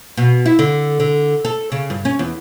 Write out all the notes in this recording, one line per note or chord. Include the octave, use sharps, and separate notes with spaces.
B2
E4
D3
D3
A4
C#3
G2
C#4
E2